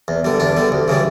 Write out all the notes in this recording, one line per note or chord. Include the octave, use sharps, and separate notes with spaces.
E2
D3 G3
E2 D4
D3 G3
D2
C#3 E3 G3